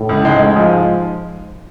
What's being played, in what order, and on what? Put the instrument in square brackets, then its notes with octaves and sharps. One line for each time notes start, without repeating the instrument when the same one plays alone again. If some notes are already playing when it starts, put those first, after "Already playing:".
Already playing: [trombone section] A2
[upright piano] C#2
[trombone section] G#2 [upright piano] G#3
[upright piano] G#3
F3